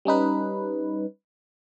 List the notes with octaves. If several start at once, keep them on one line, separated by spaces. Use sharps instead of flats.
G3 C#4 D#4 B4